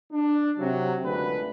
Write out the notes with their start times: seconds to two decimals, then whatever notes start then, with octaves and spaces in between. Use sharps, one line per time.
0.12 D4
0.59 C3 F#3
1.03 C#2 F#2 D3 A3 B4